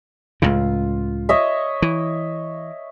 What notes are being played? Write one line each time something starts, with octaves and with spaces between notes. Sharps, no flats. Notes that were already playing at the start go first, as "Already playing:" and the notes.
C#2 A2 C#3 F4
C#5 D#5 E5
E3